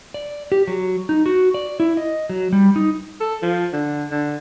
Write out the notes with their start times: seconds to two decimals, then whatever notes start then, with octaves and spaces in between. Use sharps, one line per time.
0.14 D5
0.52 G4
0.68 F#3
1.09 D#4
1.26 F#4
1.54 D5
1.80 E4
1.97 D#5
2.30 F#3
2.52 G3
2.76 D#4
3.20 A4
3.42 F3
3.73 D3
4.11 D3